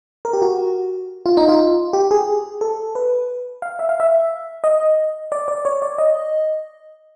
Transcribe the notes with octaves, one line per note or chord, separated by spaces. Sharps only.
A#4
G4
F#4
F4
D#4
F4
G4
G#4
A4
B4
F5
E5
F5
E5
D#5
D5
D5
C#5
D5
D#5